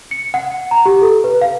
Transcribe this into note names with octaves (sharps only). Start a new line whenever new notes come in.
C#7
F#5
A#5
G4
A4
B4
F5